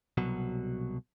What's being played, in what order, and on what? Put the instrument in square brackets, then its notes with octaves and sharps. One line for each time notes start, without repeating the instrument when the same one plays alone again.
[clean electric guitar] C2 B2 F#3